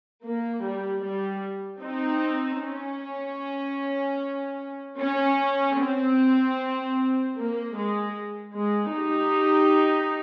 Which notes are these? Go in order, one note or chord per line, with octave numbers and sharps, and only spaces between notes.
A#3
G3
G3
C4 D#4
C#4
C#4
C4
A#3
G#3
G#3
D#4 G4